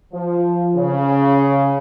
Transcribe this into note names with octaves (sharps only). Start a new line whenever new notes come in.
F3
C#3